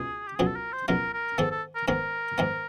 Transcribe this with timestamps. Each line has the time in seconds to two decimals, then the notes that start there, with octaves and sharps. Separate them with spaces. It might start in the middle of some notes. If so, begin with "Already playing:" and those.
Already playing: C#2 B2 G#4
0.27 G4
0.36 C#2 B2 F#3 G#4
0.46 A4
0.56 A#4
0.73 C5
0.88 C#2 B2 F#3 A#4
1.13 A#4
1.38 G#2 D#3 G#3 B3 A4
1.51 A4
1.75 A#4
1.88 G#2 D#3 G#3 B3 A#4
2.38 G#2 D#3 G#3 B3